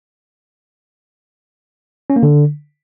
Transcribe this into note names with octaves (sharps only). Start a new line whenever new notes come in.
C#4
A#3
D3